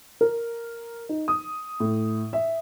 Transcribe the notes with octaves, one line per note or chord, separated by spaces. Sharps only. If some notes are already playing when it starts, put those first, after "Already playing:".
A#4
D#4
D#6
A2
E5